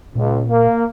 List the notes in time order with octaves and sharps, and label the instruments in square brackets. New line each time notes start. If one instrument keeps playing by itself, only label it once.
[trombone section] C#2 [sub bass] A#2
[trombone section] A#3